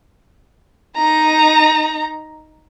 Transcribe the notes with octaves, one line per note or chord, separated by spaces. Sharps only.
D#4 A#5